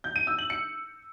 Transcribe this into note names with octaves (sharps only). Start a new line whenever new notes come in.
G6
D#7
E6
F#7
C#7